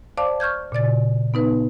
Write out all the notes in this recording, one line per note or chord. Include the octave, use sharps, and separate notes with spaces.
C5 D5 F5 A5 D6
C#6 F6 G6 G#6
A#2 C#3 D5 A6
B3 D#4 B4